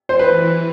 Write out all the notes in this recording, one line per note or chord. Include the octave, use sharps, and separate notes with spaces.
E3 C5
B4